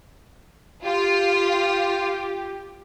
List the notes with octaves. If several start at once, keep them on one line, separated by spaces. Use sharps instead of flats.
F4 G4